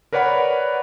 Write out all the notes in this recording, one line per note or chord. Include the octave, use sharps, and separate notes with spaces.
A#4 B4 C#5 D5 F#5 B5